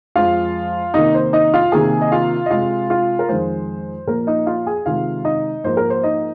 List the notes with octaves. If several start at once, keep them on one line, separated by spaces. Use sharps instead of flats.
F2 F3 G#3 F4 F5
C3 D#3 A#3 D#4 D#5
C5
D#4 D#5
F4 F5
C3 D#3 A#3 G#4 G#5
D#5
F4 F5
D#5
C3 G#3 F4 F5
F4 F5
A#4
F2 D#3 G#3 C5
A#2 F3 A#3 A#4
D#4 D#5
F4 F5
G#4 G#5
C3 D#3 G#3 F4 F5
D#4 D#5
G#2 F3 A#3 C5
A#4
C5
D#4 D#5